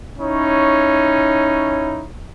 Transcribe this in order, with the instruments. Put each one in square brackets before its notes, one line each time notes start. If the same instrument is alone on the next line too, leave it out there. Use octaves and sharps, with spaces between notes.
[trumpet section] C#4 D#4 E4 C#5